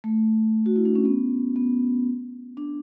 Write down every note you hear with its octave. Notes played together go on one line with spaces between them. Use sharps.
A3
F#4
E4
D4
C#4
B3
B3
D4